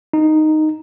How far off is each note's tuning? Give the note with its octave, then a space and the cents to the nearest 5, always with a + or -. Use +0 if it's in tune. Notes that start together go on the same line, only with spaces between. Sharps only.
D#4 -5